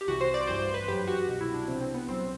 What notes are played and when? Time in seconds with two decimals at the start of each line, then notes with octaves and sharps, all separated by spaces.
0.01 G4
0.07 C2 C3 E3 F#4
0.21 C5
0.34 D5
0.47 A1 G2 E3 C5
0.62 C5
0.74 B4
0.88 F#2 F#3 G4
1.07 F#4
1.27 C2 B2 F#3 F#4
1.41 E4
1.54 D4
1.68 C2 C3 E3 C4
1.81 C4
1.94 B3
2.08 B1 A2 F#3 C4